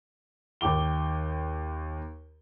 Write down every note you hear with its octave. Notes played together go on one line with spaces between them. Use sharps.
D#2 G5 D6 G7